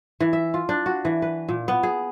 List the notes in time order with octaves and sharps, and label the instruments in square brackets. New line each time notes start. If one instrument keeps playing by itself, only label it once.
[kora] E3
E5
F4
D4
F#4
E3
B4
A#2
B3
G#4